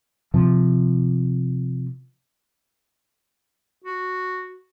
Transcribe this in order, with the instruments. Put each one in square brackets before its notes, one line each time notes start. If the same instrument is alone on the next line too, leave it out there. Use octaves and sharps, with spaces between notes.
[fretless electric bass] C3 F3
[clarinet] F#4